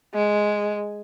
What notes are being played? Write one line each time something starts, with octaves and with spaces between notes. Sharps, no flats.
G#3